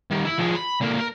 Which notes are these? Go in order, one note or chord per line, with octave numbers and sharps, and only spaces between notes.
D#3 G3
E4
F3 G#4
B5
D3 A#3
A#4